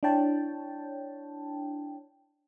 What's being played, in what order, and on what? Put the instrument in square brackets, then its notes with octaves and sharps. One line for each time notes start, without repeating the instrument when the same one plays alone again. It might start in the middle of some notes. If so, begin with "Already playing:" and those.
[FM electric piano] D4 E4 C#5 G5 A5